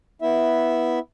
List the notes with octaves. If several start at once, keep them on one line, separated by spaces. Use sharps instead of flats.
B3 E4 E5